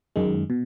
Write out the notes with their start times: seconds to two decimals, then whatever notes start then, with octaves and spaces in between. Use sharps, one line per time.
0.16 F#2 D#3 G#3
0.50 B2